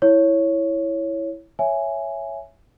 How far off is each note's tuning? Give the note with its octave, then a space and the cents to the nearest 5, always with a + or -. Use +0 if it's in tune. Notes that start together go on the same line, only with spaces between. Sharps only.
E4 +0 C#5 +0
C#5 +0 E5 +10 G#5 +0